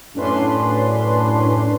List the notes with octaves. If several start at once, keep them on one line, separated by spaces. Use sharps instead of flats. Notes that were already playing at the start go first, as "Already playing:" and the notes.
F#2 A2 C#4 D4 B4 C6